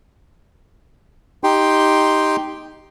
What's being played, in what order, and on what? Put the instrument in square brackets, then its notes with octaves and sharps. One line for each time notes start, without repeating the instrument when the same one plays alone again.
[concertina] D#4 G4 G5 C6